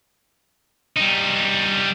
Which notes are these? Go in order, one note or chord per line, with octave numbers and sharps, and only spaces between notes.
G3 D#4